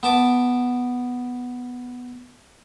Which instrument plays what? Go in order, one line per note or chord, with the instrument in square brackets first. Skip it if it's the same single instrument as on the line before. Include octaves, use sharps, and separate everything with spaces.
[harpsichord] B3 A5 D6